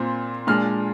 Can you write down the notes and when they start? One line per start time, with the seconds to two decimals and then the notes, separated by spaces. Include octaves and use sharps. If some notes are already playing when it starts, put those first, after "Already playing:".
Already playing: A#2 C4
0.47 A#2 G#3 D4 F6